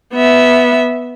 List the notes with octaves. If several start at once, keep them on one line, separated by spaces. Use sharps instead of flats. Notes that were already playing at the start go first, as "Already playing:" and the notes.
B3 E5